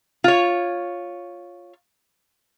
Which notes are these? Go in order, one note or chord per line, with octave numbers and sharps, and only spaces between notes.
F4 C#5